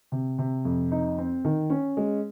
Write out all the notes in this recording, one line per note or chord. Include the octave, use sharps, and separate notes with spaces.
C3
C3
F2
D#4
C4
D#3
C#4
G#3